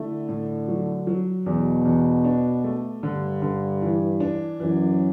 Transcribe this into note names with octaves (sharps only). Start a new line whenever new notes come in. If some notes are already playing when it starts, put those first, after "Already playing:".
Already playing: D3 A3 E4
A2
F#3
F#3
E2 B2
E2
D4
A3
G2 D3
D3
E3
D4
F#2 E3